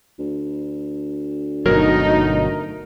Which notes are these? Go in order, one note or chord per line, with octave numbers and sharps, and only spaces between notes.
D2
G1 B2 F#3 A3 D#4 A#4